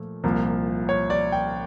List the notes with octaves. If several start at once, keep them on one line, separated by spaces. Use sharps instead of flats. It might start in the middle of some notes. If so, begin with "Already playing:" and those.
Already playing: A#2 F3 A3
C2 A#2 F3 A#3
C#5
D5
G5